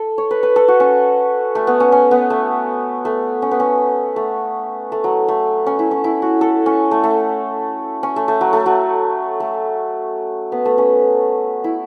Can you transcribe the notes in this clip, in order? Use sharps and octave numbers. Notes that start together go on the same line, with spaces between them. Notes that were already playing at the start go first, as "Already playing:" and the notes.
Already playing: A4
C#5
B4
B4
A4
F#4
C#4
A3
B3
C#4
C#4
B3
A3
A3
C#4
B3
C#4
A3
A3
F#3
A3
C#4
E4
C#4
E4
F#4
A4
C#4
A3
A3
C#4
A3
A3
F#3
A3
F#3
A3
B3
A3
C#4
E4